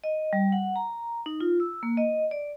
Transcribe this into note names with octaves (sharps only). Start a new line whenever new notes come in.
D#5
G3
F#5
A#5
D#4
F4
E6
A#3
D#5
D5